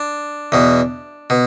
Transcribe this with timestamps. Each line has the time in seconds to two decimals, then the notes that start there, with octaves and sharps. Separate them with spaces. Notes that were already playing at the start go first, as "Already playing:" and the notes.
Already playing: D4
0.52 E2 B2
1.30 B2